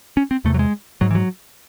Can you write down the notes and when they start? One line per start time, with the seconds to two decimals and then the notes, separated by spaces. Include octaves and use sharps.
0.17 C#4
0.31 C4
0.45 E2 C3 A3
0.54 F#3
0.59 G#3
1.01 G#2 F#3
1.11 E3
1.15 F#3